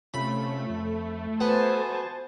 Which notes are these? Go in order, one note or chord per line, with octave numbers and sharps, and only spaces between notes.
C3 A3 C#4 F4 B5
F2
B3 F#4 C5 G#5 A5